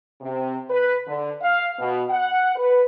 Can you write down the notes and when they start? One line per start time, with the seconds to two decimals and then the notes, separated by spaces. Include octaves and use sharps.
0.21 C3
0.70 B4
1.07 D3
1.42 F5
1.79 B2
2.09 F#5
2.56 B4